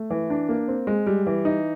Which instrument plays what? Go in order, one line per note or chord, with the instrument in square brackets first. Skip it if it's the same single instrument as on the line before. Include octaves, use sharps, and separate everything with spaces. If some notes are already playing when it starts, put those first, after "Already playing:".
Already playing: [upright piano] A3
E3
D4
A#3
C4
G#3
G3
E3
D#4